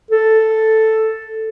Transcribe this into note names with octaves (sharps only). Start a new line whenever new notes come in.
A4